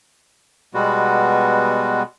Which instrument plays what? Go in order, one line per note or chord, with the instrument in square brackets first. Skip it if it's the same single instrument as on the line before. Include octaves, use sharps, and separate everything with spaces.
[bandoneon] B2 G3 G#3 B3 F#4